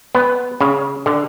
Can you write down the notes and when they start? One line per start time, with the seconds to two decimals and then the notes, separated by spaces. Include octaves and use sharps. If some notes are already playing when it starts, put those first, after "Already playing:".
0.15 B3
0.61 C#3
1.06 D3